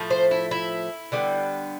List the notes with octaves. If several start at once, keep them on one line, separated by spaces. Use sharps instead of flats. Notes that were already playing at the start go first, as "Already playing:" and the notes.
Already playing: A2 F3 A3
C5
E4
E4
D3 G3 B3